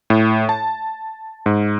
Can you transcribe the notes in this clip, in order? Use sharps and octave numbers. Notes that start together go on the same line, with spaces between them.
A2
A5
G#2